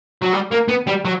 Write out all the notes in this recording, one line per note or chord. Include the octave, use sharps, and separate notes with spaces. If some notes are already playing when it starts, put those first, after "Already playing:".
F#3
G3
A#3
B3
G3
F#3